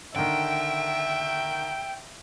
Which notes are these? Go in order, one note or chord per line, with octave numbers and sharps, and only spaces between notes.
D3 D#3 E5 G5